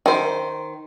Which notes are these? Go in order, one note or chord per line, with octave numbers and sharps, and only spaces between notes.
D#3 C5